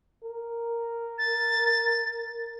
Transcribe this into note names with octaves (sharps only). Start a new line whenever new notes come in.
A#4
A6